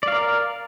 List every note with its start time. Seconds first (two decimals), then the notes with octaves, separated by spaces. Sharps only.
0.03 D5
0.08 F5
0.12 A#4